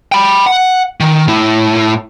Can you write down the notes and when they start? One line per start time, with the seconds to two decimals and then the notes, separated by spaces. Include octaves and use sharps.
0.12 G5 B5
0.46 F#5
1.00 D#3
1.28 A2 E4